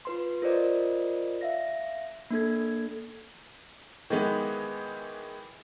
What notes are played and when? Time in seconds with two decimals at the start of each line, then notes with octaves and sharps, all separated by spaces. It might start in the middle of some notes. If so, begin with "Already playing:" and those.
0.05 F4 B4 C6
0.42 F4 A#4 C5 D5 D#5
1.41 E5 F5 A#6
2.31 A#3 D4 A4 G#6
4.10 D#3 E3 G#3 B3